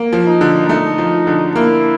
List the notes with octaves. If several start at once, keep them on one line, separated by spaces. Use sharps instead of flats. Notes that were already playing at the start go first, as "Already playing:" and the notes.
Already playing: A#3
F3
D#4
D3
A3 D#4
F3
D3
A#3 E4